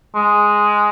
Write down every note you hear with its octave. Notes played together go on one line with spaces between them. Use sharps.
G#3